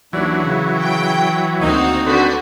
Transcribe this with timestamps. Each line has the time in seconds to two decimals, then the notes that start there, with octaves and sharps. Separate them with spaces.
0.13 D#2 E3 F#3 D4
0.43 C#3
0.80 G5
1.61 D2 D#3 A#3 C4 D#4 F#4
2.07 D3 C4 F#4 B4